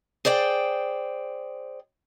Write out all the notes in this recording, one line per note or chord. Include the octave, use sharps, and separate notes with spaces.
G#4 C5 D5 G5